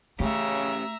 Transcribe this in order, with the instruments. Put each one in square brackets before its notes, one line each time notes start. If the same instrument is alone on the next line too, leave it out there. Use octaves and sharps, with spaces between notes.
[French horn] C#3 [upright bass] A3 [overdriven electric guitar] C#4 G4 [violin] E5 A#5